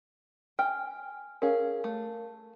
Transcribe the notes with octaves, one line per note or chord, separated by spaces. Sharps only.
G5 G#5 F6
C#4 G#4 A#4 F5
A3